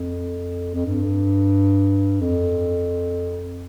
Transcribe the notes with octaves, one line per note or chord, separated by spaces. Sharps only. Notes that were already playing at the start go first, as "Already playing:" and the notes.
Already playing: F2
F2
G2
F2